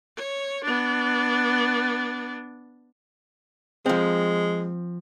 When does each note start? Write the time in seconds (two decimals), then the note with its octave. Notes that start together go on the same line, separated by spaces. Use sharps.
0.17 C#5
0.64 B3 D4
3.86 F3 G#3 C4